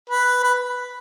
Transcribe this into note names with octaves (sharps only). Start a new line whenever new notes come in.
B4
B4